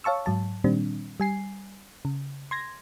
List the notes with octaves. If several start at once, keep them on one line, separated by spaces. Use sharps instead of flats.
C#5 F5 A5 C#6 E6
G#2 F#3 A5
A#2 D#3 G3 C4 D4
G3 G#5 C7
C#3
C6 G#6 A#6